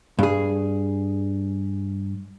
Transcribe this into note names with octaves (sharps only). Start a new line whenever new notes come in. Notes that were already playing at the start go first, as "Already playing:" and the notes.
G2 G#4